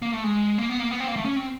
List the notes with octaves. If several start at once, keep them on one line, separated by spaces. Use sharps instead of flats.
A#3
A3
G#3
A#3
B3
A#3
B3
C4
A#3
A3
C#4
C4